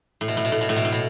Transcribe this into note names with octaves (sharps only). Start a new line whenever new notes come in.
A2
B2
A2
B2
A2
B2
A2
B2
A2
B2